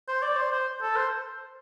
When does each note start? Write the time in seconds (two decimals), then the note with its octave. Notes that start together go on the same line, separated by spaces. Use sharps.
0.08 C5
0.23 D5
0.37 C5
0.52 C5
0.82 A4
0.96 C5